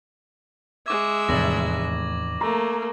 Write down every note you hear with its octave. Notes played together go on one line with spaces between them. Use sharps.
G#3 E5 C#6 D6 G#6
F1 E2 A2 A#6 F#7
A3 A#3 A#5